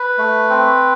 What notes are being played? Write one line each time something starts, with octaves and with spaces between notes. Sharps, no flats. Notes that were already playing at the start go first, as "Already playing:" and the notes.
Already playing: B4
A3
C4